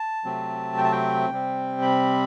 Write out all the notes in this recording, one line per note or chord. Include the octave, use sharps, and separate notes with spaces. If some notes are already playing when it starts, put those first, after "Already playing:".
Already playing: A5
C3 F#3 A3 C4
G5
A5
G5
C3 G3 C4
B5